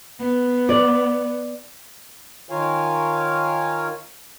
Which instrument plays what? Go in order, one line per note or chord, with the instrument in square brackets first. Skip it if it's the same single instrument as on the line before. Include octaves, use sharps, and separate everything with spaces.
[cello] B3
[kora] D5
[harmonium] D#3 F4 A#4 C#5 F5 G#5